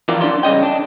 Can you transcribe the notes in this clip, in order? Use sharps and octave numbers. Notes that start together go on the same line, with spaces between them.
E3 F3 F4 A#4 D5
F#2 D4 D5 C6
G2 C#3 D#5 G5
D4